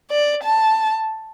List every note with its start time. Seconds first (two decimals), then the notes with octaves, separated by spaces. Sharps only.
0.11 D5
0.44 A5